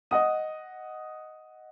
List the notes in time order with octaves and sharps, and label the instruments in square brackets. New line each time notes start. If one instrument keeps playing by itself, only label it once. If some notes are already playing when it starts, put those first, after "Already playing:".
[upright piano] D#5 F#5 D#6